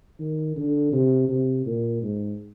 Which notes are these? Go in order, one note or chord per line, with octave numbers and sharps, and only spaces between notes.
D#3
D3
C3
C3
A#2
G#2